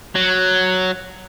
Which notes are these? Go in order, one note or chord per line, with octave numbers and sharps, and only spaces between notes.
F#3